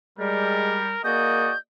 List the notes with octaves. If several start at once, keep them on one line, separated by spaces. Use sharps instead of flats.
G3 G#3 A#4
A#3 F#4 G#4 D5 D#5 G6